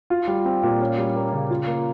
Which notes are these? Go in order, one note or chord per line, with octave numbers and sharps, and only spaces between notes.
F4
G3
C4
A#2
C#4
G3
A#3
C#3
F4
A#3